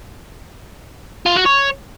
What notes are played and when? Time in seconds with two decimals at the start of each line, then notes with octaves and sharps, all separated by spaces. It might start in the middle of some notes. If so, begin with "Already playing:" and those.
1.26 F4
1.36 F#4
1.46 C#5